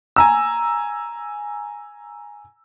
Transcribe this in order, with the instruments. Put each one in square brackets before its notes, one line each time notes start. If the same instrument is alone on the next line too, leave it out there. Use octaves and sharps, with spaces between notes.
[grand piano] G#5 A#5 E6